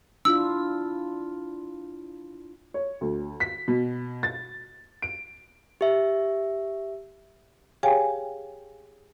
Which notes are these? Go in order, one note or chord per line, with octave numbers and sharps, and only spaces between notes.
D4 E4 F4 E6
C#5
D2
B6
B2
A6
D7
G4 E5
G4 G#4 C#5 F5 G5 G#5